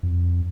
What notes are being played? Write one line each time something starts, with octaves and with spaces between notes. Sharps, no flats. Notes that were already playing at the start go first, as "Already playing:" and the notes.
F2